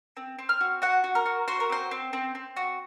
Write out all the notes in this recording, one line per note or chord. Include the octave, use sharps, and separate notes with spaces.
C4
C4
F6
F#4
F#4 F#5
F#4
A#4
F#4
F#4 C5
A#4
C4 C5
C4
C4
C4
F#4